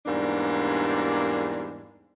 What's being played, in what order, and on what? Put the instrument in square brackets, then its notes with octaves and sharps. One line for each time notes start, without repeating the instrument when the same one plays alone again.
[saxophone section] E2 G#2 G3 A#3 D4